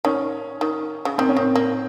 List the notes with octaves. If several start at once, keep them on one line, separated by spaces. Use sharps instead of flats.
D#3 C#4
D#3
C#3
D#3 C4
C#4
D#3 C4
A#3